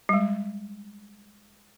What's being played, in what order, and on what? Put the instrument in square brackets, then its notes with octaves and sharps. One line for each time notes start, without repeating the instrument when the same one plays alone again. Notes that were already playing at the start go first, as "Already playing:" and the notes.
[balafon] G3 G#3